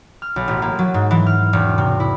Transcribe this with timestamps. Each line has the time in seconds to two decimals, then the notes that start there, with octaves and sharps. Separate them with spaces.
0.22 F6
0.36 B1
0.48 A1
0.62 A#3
0.79 F#3
0.94 G#2
1.11 E3
1.26 F6
1.53 E1
1.78 C3
2.00 E4